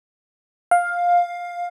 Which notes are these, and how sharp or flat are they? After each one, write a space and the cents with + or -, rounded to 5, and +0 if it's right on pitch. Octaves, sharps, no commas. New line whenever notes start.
F5 +10